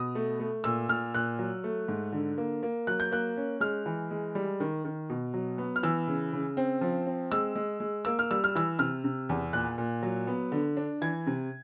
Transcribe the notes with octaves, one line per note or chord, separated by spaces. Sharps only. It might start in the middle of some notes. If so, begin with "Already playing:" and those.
Already playing: B2 D#6
A3
A3
A#2 E6
A#2 F6
A#2 F#6
F#3
A3
G#2
D3
A#3
A#3
F#3 F#6
G6
A#3 F#6
C#4
G#3 F6
E3
G#3
G3
D#3
D#3
B2
F#3
B3
F6
E3 E6
C#3
C#3
C4
F3
C4
G#3 E6
G#3
G#3
A#3 E6
F6
G3 E6
F6
E3 E6
C3 F6
C3
E2
A#2 F#6
A#2
F#3
B3
D3
D4
E3 G#6
C3